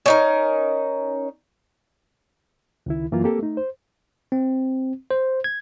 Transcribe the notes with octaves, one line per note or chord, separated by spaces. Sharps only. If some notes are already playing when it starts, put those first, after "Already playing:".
C#4 D#4 A#4
C#2 D#3 E4
F#2 E3 F#3 A#3 F4
A#3 C4 G4 A4
A3 D#4
C5
C4
C5
G#6